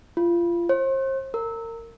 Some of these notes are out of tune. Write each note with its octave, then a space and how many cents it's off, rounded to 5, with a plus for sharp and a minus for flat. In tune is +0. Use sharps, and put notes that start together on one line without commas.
F4 -25
C5 +40
A#4 -30